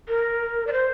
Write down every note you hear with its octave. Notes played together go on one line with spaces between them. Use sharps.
A#4
D5
C5